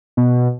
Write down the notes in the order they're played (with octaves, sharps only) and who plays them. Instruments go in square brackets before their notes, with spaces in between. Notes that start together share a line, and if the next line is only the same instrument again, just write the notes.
[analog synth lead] B2